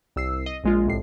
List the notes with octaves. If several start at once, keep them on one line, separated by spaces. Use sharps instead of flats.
C2 E6 C7
D#5
A#1 G#3 F4
C2 A2 C7